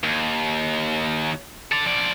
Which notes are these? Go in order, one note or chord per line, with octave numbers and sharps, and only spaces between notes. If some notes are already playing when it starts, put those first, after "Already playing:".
D#2
A4 D5
F3 D5